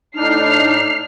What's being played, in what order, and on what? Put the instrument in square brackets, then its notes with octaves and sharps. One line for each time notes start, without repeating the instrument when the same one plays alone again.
[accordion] A2 D4 D#4 [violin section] F6 C7